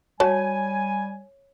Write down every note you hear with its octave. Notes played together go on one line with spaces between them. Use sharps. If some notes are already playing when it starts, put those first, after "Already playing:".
G3 F#4 C#5 G#5 A5